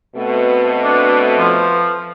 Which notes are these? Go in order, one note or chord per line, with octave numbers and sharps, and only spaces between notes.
B2 A3 C4 B4
D4
F3